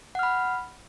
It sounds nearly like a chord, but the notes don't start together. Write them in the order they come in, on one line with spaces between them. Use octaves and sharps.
F#5 F6 B5